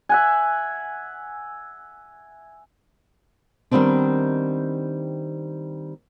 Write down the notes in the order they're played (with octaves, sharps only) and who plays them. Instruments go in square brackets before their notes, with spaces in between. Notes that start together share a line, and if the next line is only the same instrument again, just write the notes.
[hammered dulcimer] E5 F#5 G#5
[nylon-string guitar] D#3 G3 G#3 B3 C4 D4